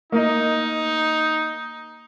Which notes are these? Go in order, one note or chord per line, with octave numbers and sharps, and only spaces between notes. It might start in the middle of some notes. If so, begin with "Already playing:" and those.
A#3 D#4 D#5